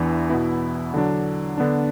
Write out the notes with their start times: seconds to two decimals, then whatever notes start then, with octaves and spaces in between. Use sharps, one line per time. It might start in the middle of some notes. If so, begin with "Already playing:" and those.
Already playing: E2 E3 D4
0.30 B2 B3 E4
0.94 D3 F#3 D4
1.57 D3 B3 D4